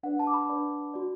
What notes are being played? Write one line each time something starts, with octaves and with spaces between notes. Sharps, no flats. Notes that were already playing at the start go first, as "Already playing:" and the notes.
D4 B4 D5 F#5
A5
D6
B5
D4 B4 D5
F#4 D5